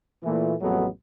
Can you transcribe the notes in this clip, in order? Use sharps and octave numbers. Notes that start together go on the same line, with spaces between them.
A#2 E3 A3
A1 F2 F#3 G#3 A3 B3